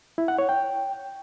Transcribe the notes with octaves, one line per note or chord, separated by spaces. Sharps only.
E4
F#5
C#5
G5